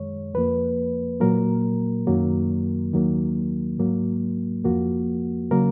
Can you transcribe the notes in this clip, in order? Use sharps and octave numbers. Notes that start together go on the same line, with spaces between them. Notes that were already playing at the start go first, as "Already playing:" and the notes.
Already playing: F#2 D#3 G#3 C#5
F2 F3 A#3 B4
A#2 F#3 A#3 A#4
F#2 D#3 F#3 A#3
D#2 D#3 F#3 A#3
G#2 F#3 A#3
F2 F3 A#3 F#4
C#3 F#3 A#3 A#4